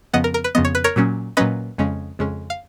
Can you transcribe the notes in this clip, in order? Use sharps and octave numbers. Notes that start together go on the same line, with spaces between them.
F2 C#3 F3 B3 D#5 F#5
A#4
A#4
B4
F2 C#3 F3 B3 D#5
C#5
B4
A#4 C#5
A#2 F#3 C#4
A#2 F#3 C#4 B4 D#5
F2 C#3 G#3 C#4
F2 C#3 G#3 C#4
F5